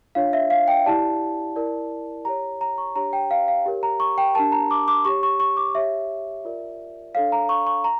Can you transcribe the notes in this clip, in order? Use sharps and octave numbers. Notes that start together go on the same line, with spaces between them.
D4 F4 C#5 F5
E5
F5
G5
E4 G4 D5 A5
E4 A#4 D5
G4 C#5 A#5
A#5
C#6
D4 G4 C#5 A#5
G5
F5
F5
G4 A#4 C#5
A#5
C#6
G5
D4 G4 A#4 A5
A#5
D6
D6
G4 C#5 C#6
C#6
C#6
D6
G4 C#5 E5
F4 A#4 D5
D4 A4 C#5 F5
A#5
C#6
C#6
A#5